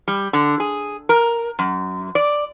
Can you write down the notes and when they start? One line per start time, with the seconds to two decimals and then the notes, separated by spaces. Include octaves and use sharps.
0.08 G3
0.33 D3
0.60 G#4
1.09 A#4
1.59 F#2
2.15 D5